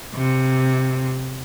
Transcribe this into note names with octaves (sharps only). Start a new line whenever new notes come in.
C3